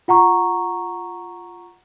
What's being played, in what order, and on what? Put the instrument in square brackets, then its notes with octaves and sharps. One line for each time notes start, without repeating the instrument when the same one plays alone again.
[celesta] F4 F#5 A#5 C#6